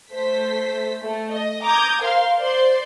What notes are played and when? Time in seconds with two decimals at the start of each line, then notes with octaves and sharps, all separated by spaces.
0.12 A3 C5 B6
1.01 A3
1.32 D#5
1.64 A#5 D6 D#6 G6 G#6
2.02 A#4 C5 F5 C6
2.38 C5 D5 C6